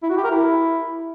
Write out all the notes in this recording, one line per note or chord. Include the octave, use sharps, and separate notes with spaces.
E4
F#4
G4
A#4
E4